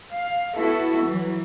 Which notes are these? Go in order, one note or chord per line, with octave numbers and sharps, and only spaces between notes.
F5
B3 E4 F#4 A4
E3 F#3